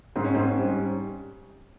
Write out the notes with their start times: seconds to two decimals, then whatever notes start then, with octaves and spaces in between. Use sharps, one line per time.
0.16 G#2 C4
0.24 C#4
0.34 G#2 C4
0.48 C#4
0.59 G3
0.69 C#4